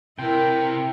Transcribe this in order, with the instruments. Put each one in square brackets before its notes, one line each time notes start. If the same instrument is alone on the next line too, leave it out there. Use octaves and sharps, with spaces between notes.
[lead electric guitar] C3 [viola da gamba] E4 A#4 [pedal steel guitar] G5